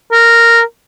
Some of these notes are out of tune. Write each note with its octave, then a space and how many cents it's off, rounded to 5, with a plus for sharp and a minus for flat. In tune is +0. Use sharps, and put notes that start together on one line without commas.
A#4 -10